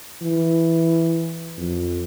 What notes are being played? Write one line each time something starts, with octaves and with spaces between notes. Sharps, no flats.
E3
F2